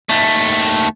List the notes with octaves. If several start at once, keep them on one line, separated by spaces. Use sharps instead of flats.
D#2 A3